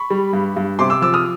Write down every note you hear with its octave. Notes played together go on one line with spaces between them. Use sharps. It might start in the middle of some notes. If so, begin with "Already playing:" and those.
Already playing: B5 C#6
G3
G2
G2
C3 C6 D6
D6 E6
F3 D6 E6
D#6 F6